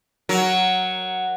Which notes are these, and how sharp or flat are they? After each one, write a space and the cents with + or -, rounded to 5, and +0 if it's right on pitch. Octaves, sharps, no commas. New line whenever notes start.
F#3 +0 F#4 +0 A#4 +0